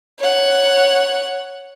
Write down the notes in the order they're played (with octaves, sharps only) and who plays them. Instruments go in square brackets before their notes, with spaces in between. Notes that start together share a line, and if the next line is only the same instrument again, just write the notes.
[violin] C#5 F#5